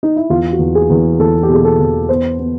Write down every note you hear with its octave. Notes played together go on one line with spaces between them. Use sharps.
D#4
E4
E2 F4
F#4
E2
G#4
E2
E2 A4
G4
B2 G#4
A4
E2
B3 C5
B3